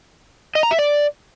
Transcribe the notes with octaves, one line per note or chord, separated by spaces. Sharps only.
D#5
A#5
E5
D5